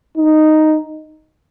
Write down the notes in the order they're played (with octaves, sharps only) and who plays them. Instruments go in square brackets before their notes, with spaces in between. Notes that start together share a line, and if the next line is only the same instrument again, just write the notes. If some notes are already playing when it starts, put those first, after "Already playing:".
[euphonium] D#4